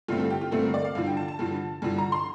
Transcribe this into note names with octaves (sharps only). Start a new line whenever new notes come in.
G2 D3 A3 C4 F4
A4
G4
F4
G2 D3 A3 C4 A4
A#4
D5
F5
G2 D3 F3 F5
G5
A5
A5
G2 D3 F3
G2 D3 F3
A#5
C6